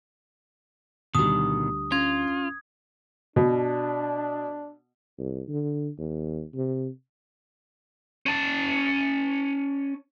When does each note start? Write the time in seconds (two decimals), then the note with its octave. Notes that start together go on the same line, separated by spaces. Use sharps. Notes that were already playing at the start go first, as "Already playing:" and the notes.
1.15 D2 B2 D#3 G3 D#6
1.92 C#4 F4 G#6
3.36 B2 D4
5.19 C2
5.49 D3
5.98 D#2
6.55 C3
8.26 C#4 A5